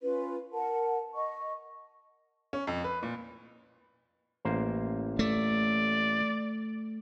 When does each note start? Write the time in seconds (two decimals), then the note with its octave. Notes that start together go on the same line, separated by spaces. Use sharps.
0.01 C#4 F4 B4
0.53 A#4 F#5 A5
1.14 D#5 C#6
2.53 C#4
2.67 F2
2.84 B4
3.03 A#2
4.45 A1 A#3 C5
5.19 A3 D5